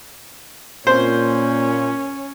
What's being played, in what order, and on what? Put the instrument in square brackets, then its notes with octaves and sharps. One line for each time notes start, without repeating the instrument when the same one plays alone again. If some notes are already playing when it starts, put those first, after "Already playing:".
[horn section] A#2 [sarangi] C#4 [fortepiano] C5